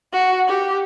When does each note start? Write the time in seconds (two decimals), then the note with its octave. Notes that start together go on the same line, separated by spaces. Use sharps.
0.13 F#4
0.48 G4